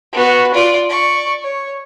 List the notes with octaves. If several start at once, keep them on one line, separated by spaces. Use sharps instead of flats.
B3 F#4
F4 D5
D5 C#6
C#5